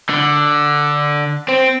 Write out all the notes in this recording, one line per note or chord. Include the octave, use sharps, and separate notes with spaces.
D3
C4